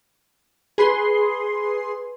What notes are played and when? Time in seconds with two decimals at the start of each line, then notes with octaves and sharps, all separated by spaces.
0.78 G#4 B4 C6